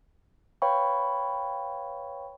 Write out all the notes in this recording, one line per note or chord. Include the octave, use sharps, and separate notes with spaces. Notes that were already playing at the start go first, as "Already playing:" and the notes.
B4 C#5 F5 G5 B5 C#6